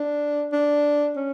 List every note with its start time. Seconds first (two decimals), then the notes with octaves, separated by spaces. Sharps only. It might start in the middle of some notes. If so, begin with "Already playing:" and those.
Already playing: D4
0.52 D4
1.16 C#4